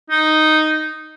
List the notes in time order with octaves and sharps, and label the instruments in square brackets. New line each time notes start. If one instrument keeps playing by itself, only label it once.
[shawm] D#4